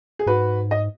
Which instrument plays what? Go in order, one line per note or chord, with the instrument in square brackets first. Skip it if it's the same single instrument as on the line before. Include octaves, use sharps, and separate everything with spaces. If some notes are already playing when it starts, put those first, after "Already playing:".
[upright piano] G#4
[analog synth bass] G#2 [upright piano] F#4 B4
[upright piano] D#5